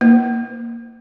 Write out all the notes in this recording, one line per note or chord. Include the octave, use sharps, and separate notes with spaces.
A#3